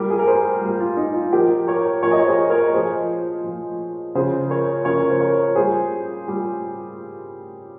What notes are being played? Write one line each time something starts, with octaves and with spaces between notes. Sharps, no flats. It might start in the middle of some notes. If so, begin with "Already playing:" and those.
Already playing: A#2 G3 G4 A#4
G#4
A#4
G#4 C5
A#2 G3
F4
D#4
F4
A#2 F3 G4 A#4
A#4 C#5
A#2 F3 A#4 C#5
D#5
C#5
G#4 C5
A#4 C#5
A#2 F3 G#4 C5
A#2 F3
C#3 F3 G#4 C5
A#4 C#5
C#3 F3 A#4 C#5
A#4
C5
A#4 C#5
A#2 G3 G#4 C5
A#2 G3